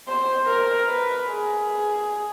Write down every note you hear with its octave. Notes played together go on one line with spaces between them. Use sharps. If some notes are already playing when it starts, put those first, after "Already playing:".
C5
A#4
B4
G#4